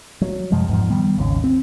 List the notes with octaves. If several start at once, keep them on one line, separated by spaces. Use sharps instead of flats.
F#3
F#2 C3 F3 G#3
E2 G#2 F3
D#3 G3 B3
G#1 D#2 C#3
C4